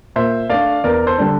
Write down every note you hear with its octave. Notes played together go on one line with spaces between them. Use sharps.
A#2 C5 E5
A3 D4 D5 F5
E2 A#4 D5
A4 C5
D3 G3 D4